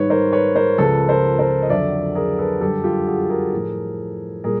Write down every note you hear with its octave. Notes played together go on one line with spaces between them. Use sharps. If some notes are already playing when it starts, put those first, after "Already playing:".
Already playing: G#2 D#3 G3 B4 C#5
A#4 C5
B4 C#5
A#4 C5
C#2 C#3 F3 A4 B4
A#4 C5
A#4 C5
D#5
F2 D3 F#3 D5 E5
G#4 A#4
A4 B4
F#2 D3 G3 G4 A4
F4 G4
F#4 G#4
G#4 A#4
A2 F3
A#2 G3 G#4 A#4